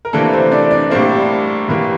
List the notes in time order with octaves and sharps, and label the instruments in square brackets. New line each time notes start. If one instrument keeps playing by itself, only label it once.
[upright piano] A#4
C3 E3 A3 A#3 D4 A4
C4 C5
D4 D5
D4 D5
A2 G3 A#3 C4 D4 C5
A2 E3 G3 A#3